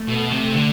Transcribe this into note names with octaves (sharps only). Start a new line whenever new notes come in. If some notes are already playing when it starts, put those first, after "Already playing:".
Already playing: A3
B2
C3
D3